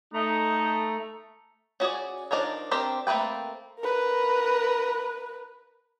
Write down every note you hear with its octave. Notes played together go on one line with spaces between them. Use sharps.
A3 D#4 A#5
C#4 F#4 G#4 D5
F3 D4 D#4 A#4 C#5
C4 D4 G4 A#4 C5
A3 A#3 C4 B4 G5
A#4 B4